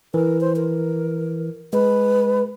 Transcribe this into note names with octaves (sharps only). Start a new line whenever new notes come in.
E3 A#4
C5
A#4
G#3 B4